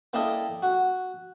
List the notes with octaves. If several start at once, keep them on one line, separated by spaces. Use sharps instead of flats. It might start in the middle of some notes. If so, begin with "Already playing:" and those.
A#3 E4 A4 D5 D#5 G5
F#4